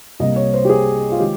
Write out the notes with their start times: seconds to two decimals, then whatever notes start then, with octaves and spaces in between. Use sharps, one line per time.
0.20 C2 C3 G3 A#3 D#5
0.36 C#5
0.54 C5
0.65 G4
0.69 G#4
1.12 F4
1.20 D#3 G#3 G4